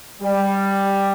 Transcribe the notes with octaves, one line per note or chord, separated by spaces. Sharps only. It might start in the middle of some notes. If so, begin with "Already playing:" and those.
G3